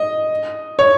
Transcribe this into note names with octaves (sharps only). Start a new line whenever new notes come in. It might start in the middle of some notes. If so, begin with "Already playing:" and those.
Already playing: D#5
C#5